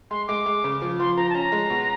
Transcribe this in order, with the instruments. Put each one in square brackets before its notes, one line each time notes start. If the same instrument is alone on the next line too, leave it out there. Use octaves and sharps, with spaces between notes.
[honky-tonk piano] G#3 [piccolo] C6
[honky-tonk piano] G#3 [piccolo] D6
[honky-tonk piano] G#3
C#3
F3
[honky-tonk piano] F3 [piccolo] C6
[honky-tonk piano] F3 [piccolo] A#5
[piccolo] A5
[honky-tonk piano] C#4 [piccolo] A#5
[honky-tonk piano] G#3
B2